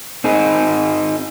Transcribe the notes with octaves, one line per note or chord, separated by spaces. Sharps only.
C4 D#4 G#4